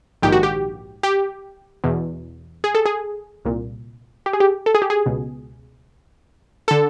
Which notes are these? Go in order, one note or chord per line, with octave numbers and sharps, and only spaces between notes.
A#1 G#2 D#3 G4
F#4
G4
G4
E2 B2
G#4
A4
G#4
C2 A#2
G4
G#4
G4
A4
G#4
G4
G#4
C#2 B2
D3 A4